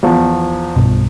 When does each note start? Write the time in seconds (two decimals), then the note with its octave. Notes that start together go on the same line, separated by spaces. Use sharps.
0.03 E2 F3
0.76 B1 G2 B2